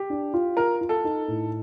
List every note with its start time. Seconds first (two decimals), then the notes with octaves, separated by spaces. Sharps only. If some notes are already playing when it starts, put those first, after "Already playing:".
Already playing: G4
0.10 D4
0.34 F4
0.57 F4 A#4
0.81 F4
0.89 A4
1.04 D#4
1.28 A2